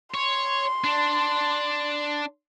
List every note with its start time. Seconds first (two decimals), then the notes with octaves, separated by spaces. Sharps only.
0.14 C#5 C6
0.84 D4